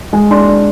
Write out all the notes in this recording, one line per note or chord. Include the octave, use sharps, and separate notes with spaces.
G#3 G#5
D4 C6
D4